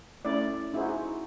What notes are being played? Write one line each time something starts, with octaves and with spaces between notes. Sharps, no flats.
A3 C#4 E4 D5
D#4 E4 F#4 G#4 C5